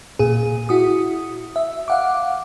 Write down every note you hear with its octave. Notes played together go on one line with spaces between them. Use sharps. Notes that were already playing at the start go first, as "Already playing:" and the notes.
A#2 G#4
E4 F#4 D#6
E5
F5 F#5 D6